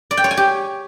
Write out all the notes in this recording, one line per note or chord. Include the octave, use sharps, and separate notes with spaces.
D5
G5
C#5
G#5
G4